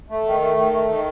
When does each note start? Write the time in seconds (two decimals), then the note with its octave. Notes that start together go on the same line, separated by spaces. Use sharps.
0.09 A3
0.26 D#3
0.41 A3
0.57 D#3
0.73 A3
0.89 D#3